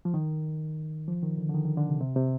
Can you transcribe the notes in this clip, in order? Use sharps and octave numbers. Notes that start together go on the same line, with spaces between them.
F3
D#3
F3
D#3
D3
D3
D#3
D#3
D3
C3
C3
C3